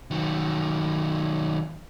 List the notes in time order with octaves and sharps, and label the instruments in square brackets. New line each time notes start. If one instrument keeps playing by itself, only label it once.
[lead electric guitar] D#3 F#3